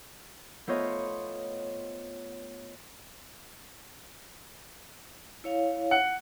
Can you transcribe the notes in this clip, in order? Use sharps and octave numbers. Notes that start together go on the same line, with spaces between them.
A3 B3 F4 C5 C#5 D#5
E4 C#5 F5
F#5